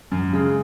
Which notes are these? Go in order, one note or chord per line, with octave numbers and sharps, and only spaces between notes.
F#2
C#3 G#3